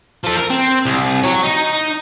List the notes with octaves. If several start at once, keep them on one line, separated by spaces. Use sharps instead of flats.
F3 A4
A#4
C4
C2
F#3 C#5
D#4